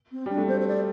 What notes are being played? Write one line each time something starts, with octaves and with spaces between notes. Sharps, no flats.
C4
G3 D4
A3
C4 C5
C5
D5